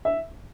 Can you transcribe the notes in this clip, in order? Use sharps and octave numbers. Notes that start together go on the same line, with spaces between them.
E5